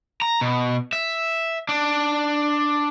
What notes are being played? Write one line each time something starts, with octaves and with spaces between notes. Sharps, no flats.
A#5
B2
E5
D4